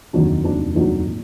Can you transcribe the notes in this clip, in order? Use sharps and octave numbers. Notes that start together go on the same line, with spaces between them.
F1 D#2 D#3 F#3 D4
F1 D#2 D#3 F#3 D4
F1 D#2 D#3 F#3 D4
A#2